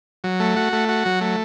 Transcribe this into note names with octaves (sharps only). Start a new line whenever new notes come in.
F#3
A3
F#4
A3
F#4
F#3
A3